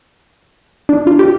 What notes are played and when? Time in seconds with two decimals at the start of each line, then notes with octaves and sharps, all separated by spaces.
0.89 D4
1.07 F4
1.19 G4